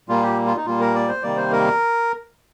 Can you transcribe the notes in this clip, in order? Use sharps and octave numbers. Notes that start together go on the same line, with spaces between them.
A#2 G3 A#3 F4
G4
F4
D#4
A#2 G3 A#3 F4
A#4
D5
C5
C3 D#3 G3 A#3 D5
C5
A#4